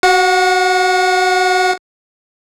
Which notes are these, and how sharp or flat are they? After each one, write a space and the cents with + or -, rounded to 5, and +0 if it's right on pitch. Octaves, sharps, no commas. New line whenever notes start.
F#4 +15 F#5 -35